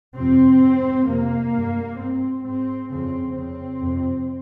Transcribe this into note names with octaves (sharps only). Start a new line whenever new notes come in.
F2 C3 C4
G#2
F2 C3 A#3
G2
G#2 C4
G#2 C4
F2 C#3 C4
F2 C#3 C4
F2 C3